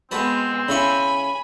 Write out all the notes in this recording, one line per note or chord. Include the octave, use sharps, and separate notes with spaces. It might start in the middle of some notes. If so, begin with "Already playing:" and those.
G#3 B3 C4 F#4 B4 A5
C#3 E4 G#5 B5 C#6